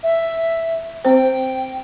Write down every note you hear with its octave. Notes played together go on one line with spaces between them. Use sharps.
E5
C4 C5 G5